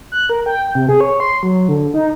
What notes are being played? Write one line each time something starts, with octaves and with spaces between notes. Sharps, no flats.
F#6
A#4
G5
C3
G#4
C#5
C6
F#3
D3
D#4